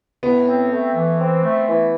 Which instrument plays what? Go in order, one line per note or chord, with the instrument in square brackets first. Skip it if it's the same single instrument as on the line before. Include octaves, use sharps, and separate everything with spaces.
[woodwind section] A2 [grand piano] B3
[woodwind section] C4
A3
E3
C4
A3
E3